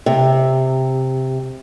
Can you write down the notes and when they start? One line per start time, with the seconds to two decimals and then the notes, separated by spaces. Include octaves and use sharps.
0.06 C3